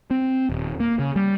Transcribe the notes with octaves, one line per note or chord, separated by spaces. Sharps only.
C4
D#1
A#3
C#3
G3